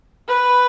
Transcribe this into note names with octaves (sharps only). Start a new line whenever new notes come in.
B4